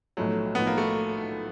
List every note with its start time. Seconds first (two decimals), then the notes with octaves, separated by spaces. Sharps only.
0.17 B1 A2 F3 F#3 A3
0.55 B1 A2 F3 A3 B3
0.67 A#3
0.78 A3